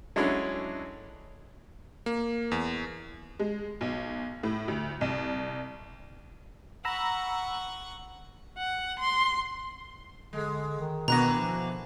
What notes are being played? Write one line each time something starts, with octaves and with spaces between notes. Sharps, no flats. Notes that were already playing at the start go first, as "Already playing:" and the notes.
F#3 G#3 A3 C#4 D4 E4
A#3
E2
G#3
B1
A2
D2
C2
F#5 A#5 B5 C#6 E6
F#5
C6
D3 G#3
D#3
B2 D3 E3 B3 F#4 A#5 F#6 A#6
F3